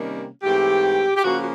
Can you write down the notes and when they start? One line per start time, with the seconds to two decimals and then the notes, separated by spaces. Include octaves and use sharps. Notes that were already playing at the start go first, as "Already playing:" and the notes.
Already playing: C3 D#3 G3 A#3 C#4
0.43 G#2 E3 A3 C4 G4
1.17 G4
1.24 C#3 F3 A#3 C#4 F#4
1.39 F#4